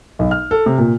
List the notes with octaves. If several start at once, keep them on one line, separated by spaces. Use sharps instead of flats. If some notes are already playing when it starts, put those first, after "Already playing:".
B1
F6
A4
C3
A#2